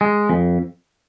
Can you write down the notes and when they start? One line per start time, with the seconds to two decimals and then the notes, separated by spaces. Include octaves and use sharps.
0.01 G#3
0.30 F2